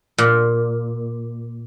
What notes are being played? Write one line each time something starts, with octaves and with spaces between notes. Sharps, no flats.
A#2